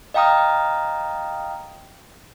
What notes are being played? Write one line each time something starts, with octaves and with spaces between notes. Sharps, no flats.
D#5 F5 G5 A#5 D#6 F6